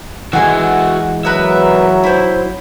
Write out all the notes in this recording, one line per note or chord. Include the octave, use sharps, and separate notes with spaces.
E3 G#3 F#4 E5 F#5 G#5
F#3 B3 A#4 B4 E5
E4 C5